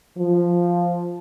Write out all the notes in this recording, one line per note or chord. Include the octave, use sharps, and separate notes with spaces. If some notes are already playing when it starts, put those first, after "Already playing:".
F3